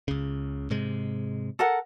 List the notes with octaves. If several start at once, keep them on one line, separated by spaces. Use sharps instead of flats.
C#2 C#3
G#2 C3 G#3
A4 A#4 F#5